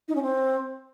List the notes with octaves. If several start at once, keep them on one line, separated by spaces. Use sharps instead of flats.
D#4
C#4
C4